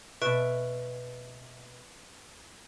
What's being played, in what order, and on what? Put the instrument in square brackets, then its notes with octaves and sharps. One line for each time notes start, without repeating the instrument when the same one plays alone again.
[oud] B2 E5 [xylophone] B4 C#6 D7